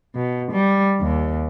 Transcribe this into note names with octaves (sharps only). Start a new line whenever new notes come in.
B2
G3
D#2